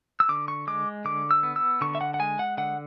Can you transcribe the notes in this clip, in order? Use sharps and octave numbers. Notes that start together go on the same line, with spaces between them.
E6
D3 D6
C#6
G#3 D6
D3 D6
E6
B3
E6
D3 C#6
E5
F#5
F#5
G#3 G#5
F#5
D3 F#5